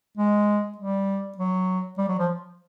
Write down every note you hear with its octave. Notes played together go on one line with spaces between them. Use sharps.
G#3
G3
F#3
G3
F#3
F3